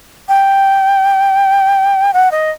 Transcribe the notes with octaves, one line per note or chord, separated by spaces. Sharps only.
G5
F#5
D#5